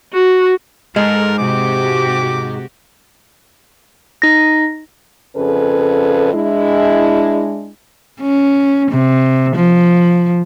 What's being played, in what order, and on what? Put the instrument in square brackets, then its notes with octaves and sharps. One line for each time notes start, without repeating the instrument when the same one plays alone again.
[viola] F#4
[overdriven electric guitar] G#2 [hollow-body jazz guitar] G#3 [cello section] A4 [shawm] A#4
[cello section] C3 F#4 G4 [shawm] D6
[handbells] D#4 A#6
[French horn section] F2 C#3 C#4 G#4 A4 B4
G#3 D4 E4
[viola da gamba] C#4
C3
F3